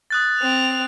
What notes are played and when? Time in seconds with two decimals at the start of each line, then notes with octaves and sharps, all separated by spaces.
0.10 D#6 F#6 A6
0.39 C4 F7